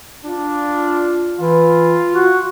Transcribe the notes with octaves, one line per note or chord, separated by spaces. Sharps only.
D4 F4
E3 F4
F#4